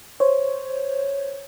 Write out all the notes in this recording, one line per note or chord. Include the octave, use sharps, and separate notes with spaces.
C5 C#5